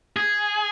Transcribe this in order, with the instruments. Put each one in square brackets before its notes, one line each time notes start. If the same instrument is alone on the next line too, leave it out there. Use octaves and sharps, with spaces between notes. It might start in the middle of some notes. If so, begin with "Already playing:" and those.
[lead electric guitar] G#4